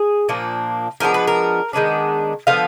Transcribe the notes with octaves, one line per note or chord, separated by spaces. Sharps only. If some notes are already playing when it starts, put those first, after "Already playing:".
Already playing: G#4
A#2 F3 A#3 D4
F3 G#3 B3 D4 A#4
B4
A#4
D#3 G#3 B3 D4
D3 F3 B3 F5